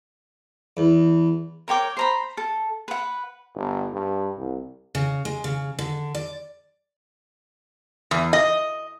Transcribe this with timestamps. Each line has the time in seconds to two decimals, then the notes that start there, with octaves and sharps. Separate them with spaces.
0.77 E2
1.68 A#4 C#5 G5 D6
1.97 C5 A#5 B5
2.37 A4
2.88 B4 F#5
3.55 G1
3.94 G2
4.38 C2
4.95 C#3
5.25 G#3
5.44 C#3
5.79 D3
6.15 D5
8.11 E2
8.33 D#5